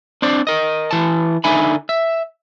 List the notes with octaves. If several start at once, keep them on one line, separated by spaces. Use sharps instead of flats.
C4 D4 C5 D5
A#4 D#5
E3 A5
D3 D#4 E5 G#5 B5
E5